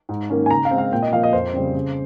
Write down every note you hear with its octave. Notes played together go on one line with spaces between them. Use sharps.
G#2
D#3 A#3 C#4
G#5
C#3 A#5
F5
G#3 C4
F5
A#2 G5
D#5
F3 A#3 F5
D#5
F2 C5
C#3 G3 C4
C#3